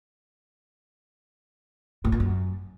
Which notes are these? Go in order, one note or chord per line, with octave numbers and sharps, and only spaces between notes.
A2
A#2
F#2